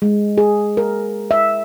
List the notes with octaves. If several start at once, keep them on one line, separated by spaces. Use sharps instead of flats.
G#3
G#4
A#4
E5